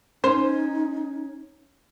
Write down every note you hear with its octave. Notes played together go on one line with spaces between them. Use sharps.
C#4 D#4 C5